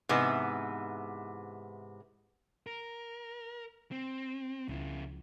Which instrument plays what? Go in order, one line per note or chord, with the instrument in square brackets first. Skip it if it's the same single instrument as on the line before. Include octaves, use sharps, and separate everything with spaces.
[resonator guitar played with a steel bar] G#2 C3 E3 B3
[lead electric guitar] A#4
C4
[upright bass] C#2 F3 [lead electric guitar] C#3 E4